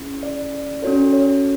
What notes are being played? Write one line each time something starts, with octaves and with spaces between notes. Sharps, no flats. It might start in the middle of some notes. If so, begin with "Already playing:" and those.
Already playing: C#4 E4 G#4
D5
D5
C#4 F#4 A4 C#5
C#5